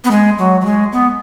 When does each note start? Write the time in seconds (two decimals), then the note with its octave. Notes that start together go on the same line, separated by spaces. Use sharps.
0.04 B3
0.11 G#3
0.38 F#3
0.61 F#3
0.65 G#3
0.92 B3